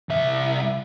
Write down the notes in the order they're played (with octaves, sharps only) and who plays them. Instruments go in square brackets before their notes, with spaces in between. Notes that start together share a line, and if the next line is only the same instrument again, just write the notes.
[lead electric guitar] C2 E5